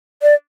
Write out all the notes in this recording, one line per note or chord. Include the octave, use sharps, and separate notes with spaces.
D5